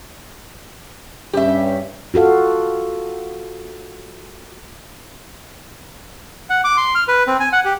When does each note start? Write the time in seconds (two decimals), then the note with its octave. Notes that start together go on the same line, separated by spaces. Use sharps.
1.33 G2 C#4 G4 E5
2.14 F4 F#4 A4 F5
6.50 F#5
6.64 D6
6.77 C6
6.95 F6
7.08 B4
7.27 C4
7.40 G#5
7.53 F#5
7.65 G4